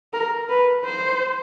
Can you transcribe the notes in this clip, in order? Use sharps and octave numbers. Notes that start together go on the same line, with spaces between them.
A#4
B4
C5